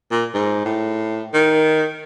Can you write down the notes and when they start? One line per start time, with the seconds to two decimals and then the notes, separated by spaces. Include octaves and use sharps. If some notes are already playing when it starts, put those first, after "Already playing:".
0.11 A#2
0.34 G#2
0.65 A2
1.33 D#3